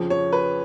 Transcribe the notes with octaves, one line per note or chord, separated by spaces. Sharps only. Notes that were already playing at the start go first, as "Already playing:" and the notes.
Already playing: F2 C#3 F3
C#5
B4